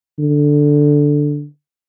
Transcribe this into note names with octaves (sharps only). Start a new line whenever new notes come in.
D3